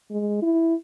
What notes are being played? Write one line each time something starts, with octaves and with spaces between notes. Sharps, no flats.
G#3
E4